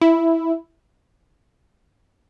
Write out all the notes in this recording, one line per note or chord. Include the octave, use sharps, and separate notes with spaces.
E4